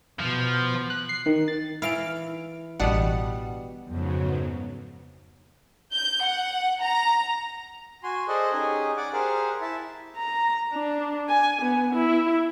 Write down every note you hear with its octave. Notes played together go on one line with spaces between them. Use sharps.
B2 F3
F#6
C7
D#3
A6
E3 E4 F5 D7
A1 B2 G3 B3 D4 F#5
F2 G#2 C#3 F#3 B3
G6
F#5
A#5
F#4 G#5 C6
G#4 A4 C5 D5 D#5 F#5
C#4 D#4 G4 G#4 G#5
D5 F#5 D6
G4 G#4 A#4 C5 F5 F#5
E4 E5 A5
A#5
D4
G#5
B3
E4